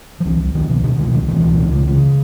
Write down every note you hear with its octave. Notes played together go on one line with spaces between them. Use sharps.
F3
C2 E3
C2
C2 D#3
B2
B2 D3
C2 D#3
C2 D#3
B2 E3
C#2
C#2
C#3
C#3